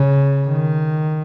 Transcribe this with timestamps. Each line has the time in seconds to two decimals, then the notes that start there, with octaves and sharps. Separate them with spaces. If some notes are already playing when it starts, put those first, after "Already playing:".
Already playing: C#3
0.48 D#3